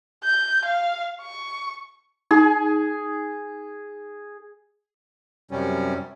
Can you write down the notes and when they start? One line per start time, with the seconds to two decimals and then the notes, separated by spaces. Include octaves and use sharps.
0.24 G6
0.65 F5
1.22 C#6
2.31 D#4 G#4
5.51 F#2 C3 G3 C#4